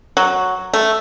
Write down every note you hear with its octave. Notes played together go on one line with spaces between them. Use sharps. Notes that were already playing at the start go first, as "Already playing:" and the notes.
F#3
A3